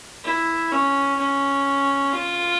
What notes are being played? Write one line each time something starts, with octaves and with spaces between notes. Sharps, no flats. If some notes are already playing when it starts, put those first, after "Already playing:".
E4
C#4
C#4
F4